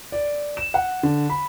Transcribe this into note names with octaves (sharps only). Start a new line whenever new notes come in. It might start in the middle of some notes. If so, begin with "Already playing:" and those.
D5
E7
F#5
D3
B5